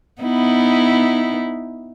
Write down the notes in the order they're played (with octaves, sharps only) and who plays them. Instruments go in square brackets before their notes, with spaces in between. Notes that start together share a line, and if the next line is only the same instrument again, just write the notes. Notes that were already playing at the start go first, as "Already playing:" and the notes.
[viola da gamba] B3 D#4 E4